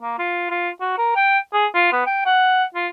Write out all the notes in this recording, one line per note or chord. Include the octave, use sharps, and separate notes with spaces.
A#3
F4
F4
F#4
A#4
G5
G#4
F4
B3
G5
F#5
F4